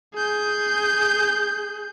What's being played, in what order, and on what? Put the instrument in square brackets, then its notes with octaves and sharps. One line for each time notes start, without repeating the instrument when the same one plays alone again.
[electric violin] G#4 G6